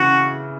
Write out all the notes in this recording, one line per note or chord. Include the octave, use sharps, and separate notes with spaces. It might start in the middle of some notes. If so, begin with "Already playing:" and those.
Already playing: C#3 E3 F#4